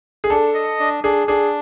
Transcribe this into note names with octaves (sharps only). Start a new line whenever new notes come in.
G#4
D4 A4
D#5
D4
D4 G#4
D4 G#4